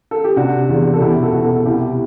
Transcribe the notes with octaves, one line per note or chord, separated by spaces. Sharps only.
A4
G4
C3 D4 F#4
E2
A4
B2 E4 G4
F#4 A4
B2
F#4 A4
C2 E4 G4